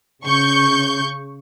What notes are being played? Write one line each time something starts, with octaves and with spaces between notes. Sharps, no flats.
C#3 C#6 G6